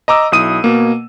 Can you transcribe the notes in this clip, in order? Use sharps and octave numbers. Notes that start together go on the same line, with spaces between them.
D#5 A#5 D6 E6
B1 E4 D#6 D#7
B2 A#3